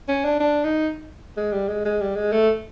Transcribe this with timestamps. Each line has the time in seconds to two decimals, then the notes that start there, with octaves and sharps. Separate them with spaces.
0.08 C#4
0.25 D4
0.40 D4
0.64 D#4
1.37 G#3
1.52 G3
1.68 G#3
1.85 G#3
2.01 G3
2.16 G#3
2.32 A3